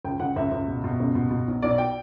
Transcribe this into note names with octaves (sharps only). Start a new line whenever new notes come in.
C#2 G5
C#2 F#5
C#2 E5
C#2
B2
B2
C#2
B2
B2
B1
B1 D5
G5